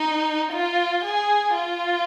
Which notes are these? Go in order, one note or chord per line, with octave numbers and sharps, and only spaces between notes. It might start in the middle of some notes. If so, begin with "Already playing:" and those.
Already playing: D#4
F4
G#4
F4